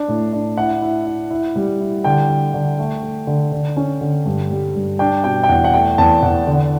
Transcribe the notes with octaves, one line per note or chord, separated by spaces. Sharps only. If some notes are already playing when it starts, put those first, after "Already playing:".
Already playing: D4
A2
D4
E4 F#5
E4
E4
E4
G3
E4
D3 G5
D3
D3
A3
A3
D3
D3
C#4
D3
G2
G3
G2
D4 G5
B2 G5
G5
E2 F#5
F#5
A3 G5
E2 A5
E2 F#5
D3